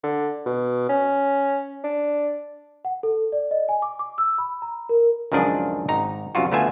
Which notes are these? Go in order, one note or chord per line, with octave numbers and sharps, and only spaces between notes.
D3
B2
C#4
D4
F#5
A4
D5
D#5
G#5
D6
D6
E6
B5
A#5
A#4
C#2 F#2 D#3 F3 D4 G#4
G#1 D#4 A#5
C2 F#2 C3 F4 F#4
D2 A3 B3 F4 E5 G#5